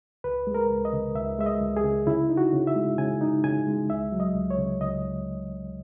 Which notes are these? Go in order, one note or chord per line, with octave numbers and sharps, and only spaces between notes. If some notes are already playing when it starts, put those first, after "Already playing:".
C#2 B4
G#3
A#4
C#2
D#5
C#3
C#2 E5
G#3 E5
D#5
C#2
G#4
C#3
C#3 E4
D#4
F#4
C#3
E5
G#3
C#3 G#5
D#4
C#3 G#5
G#3
C#2 E5
F#3
D#5
C#2
C#5
C#3
C#2 D#5